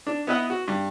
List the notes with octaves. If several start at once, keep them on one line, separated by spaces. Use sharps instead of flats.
D4
B3 E4 B4 D#5 F#5
F#4
G2